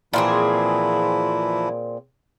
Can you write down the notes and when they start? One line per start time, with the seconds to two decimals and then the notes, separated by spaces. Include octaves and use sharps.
0.13 A#2 E3 F3 C4 E4 G#4